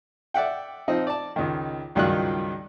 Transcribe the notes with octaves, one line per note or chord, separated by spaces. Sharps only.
D5 E5 F#5 G5
F3 C4 D#4 D#5
D5 A5
C#2 D#3
C#2 G2 D#3 F#3 F4 F#6